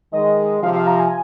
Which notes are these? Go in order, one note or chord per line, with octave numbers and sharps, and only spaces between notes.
D#3 G#3 D#5
C3 F3 F5
F5
A#5
G#5